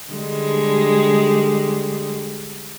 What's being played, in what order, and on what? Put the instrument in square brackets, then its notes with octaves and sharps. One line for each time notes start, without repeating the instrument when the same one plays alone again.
[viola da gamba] D3 G3 G#3